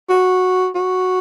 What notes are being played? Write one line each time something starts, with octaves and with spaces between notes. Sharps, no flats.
F#4
F#4